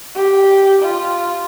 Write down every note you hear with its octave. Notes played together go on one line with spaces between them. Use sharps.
G4
F4